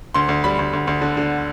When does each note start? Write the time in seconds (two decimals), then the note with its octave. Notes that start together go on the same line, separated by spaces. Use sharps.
0.14 D2 C6
0.29 D2
0.44 G3 B5
0.59 D2
0.73 D2
0.87 D2
1.02 D3
1.17 D3